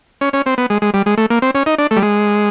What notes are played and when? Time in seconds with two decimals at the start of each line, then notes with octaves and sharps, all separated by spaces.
0.21 C#4
0.33 C#4
0.46 C4
0.58 B3
0.70 G#3
0.82 G#3
0.94 G3
1.06 G#3
1.18 A3
1.30 A#3
1.42 C4
1.55 C#4
1.66 D#4
1.78 D4
1.91 A3
1.97 G3
2.02 G#3